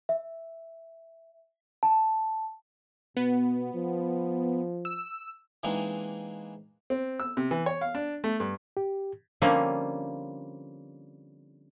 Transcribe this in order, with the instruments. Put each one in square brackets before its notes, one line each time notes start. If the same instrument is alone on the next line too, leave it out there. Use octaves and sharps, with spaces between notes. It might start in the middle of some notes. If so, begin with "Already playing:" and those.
[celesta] E5
A5
[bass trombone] B2 [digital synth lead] B3
[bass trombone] F3
[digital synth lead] E6
[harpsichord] E3 G#3 A#3 C4 D4 D#4
[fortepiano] C4
E6
C3
E3
C#5
F5
D4
A3
G2
[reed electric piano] G4
[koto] D3 F3 G3 A#3 C4 C#4